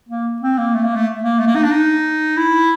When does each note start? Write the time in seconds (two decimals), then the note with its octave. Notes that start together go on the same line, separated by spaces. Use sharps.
0.09 A#3
0.42 C4
0.58 A#3
0.75 A3
0.85 A#3
0.96 A3
1.24 A#3
1.39 A3
1.47 A#3
1.55 D#4
1.63 D4
1.72 D#4
2.37 E4